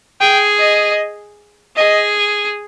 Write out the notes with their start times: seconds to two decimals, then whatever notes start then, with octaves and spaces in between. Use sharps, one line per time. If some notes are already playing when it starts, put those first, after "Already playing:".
0.21 G#4 G5
0.59 D#5
1.77 G#4 D#5